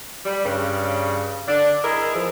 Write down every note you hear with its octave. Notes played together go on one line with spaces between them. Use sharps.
G3
G2 C#3
D3 D4
E4 G#4 A#4 D#5
E3 F3 G#4